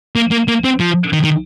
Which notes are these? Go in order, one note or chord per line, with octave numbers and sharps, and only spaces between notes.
A#3
A#3
A#3
C4
F3
D#3
D#3